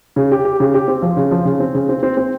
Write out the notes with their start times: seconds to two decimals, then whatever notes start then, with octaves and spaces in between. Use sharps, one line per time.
0.16 C#3
0.31 G4
0.45 G4
0.60 C#3
0.74 G4
0.88 C4
1.02 F3
1.17 C#3
1.31 F3
1.45 C#3
1.60 C4
1.75 C#3
1.89 C4
2.03 C4
2.17 C4